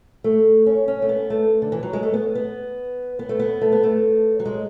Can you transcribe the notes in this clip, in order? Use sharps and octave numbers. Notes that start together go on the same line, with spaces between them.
A3
C#4
C#4
A3
B3
A3
D3
E3
F#3
G#3
A3
B3
B3
B3
A3
B3
A3
B3
A3
F#3
G#3